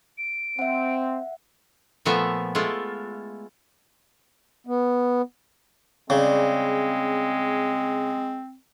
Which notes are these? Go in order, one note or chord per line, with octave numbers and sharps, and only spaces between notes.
D7
C4 E5 F#5
A#2 F3 A3 B3 E5 A#5
G#3 A3 E4 F4
B3
C#3 G3 G#3 C4 D5